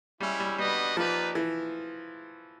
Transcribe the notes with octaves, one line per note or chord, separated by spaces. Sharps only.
G3 G#3 C#4 E4
G3
G3 B3 D4 F#4 B4 D#5
F3 A#3 D#4 G4 B4 D5
E3